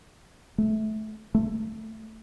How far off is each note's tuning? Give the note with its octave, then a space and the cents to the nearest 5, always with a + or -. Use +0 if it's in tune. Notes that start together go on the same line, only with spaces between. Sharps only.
A3 -20
A3 +5